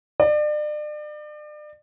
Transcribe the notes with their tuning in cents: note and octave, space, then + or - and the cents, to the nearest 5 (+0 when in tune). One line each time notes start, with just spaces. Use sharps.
D5 +35